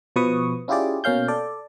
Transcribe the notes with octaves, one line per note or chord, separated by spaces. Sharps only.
B2 F3 B4 C#6 D#6
C#4 E4 F4 G4 G#4 D5
B2 A#3 C#4 F5 G6
A4 D5